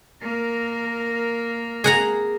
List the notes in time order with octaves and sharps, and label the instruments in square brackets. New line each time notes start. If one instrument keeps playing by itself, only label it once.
[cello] A#3 A#4
[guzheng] G#4 F#5 A#5